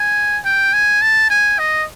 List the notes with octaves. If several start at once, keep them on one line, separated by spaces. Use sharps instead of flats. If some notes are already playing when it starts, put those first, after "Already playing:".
Already playing: G#5
G5
G#5
A5
G#5
D#5